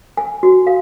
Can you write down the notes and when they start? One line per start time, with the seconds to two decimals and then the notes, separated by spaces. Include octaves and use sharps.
0.17 G#5
0.43 F#4
0.67 F5